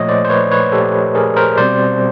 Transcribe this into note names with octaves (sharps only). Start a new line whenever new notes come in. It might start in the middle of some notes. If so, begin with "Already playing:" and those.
Already playing: A#2 F3 A3 C#5 D#5
C5 D5
C5
B4 C#5
B4 C#5
G4 A4
G#4 A#4
A#4 C5
B2 G3 C4 C5 D5